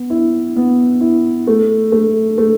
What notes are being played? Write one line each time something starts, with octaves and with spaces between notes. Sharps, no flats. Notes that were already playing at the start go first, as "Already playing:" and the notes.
Already playing: B3
E4
B3
E4
A3
A3
A3